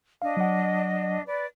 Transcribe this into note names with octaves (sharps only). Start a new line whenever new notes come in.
D4 D#5 F5
F#3 F#5
B4 D5